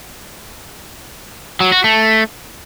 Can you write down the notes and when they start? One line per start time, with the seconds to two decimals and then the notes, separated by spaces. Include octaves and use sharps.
1.60 F#3
1.72 F#4
1.84 A3